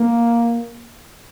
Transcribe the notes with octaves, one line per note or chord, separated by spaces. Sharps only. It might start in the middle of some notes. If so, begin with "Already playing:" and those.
Already playing: A#3